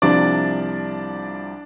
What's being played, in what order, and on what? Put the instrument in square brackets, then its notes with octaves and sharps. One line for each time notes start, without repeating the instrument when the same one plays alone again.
[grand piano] C2 C3 F3 D4 D5